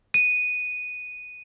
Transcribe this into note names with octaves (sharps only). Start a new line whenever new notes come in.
D#7